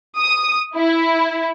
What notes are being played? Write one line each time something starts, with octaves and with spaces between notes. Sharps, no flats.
D#6
E4